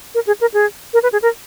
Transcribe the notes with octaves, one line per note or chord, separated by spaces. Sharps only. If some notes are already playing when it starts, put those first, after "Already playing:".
A#4
G#4
A#4
G#4
A#4
B4
G#4
A#4